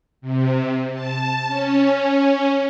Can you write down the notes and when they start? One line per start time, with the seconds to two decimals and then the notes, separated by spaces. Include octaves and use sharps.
0.21 C3
0.93 A5
1.47 C#4